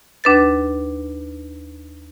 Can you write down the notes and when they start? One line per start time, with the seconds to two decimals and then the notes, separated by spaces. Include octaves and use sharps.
0.24 D#2 D4 B4 A6